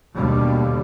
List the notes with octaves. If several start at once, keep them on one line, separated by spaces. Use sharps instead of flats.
D#2 B2 D3 G3